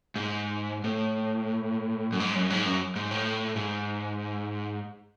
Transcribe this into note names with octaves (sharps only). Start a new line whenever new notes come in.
G#2
A2
F#2
G#2
F#2
G#2
F#2
G#2
A2
G#2